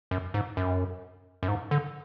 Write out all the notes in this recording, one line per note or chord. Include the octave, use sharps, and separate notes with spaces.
F#2
G#2
F#2
F#2
G#2
D3